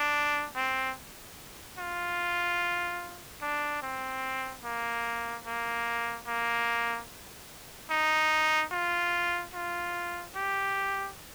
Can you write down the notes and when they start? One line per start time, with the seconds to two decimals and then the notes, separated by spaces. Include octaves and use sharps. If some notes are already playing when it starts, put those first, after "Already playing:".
Already playing: D4
0.56 C4
1.78 F4
3.42 D4
3.82 C4
4.64 A#3
5.46 A#3
6.27 A#3
7.91 D#4
8.72 F4
9.54 F4
10.36 G4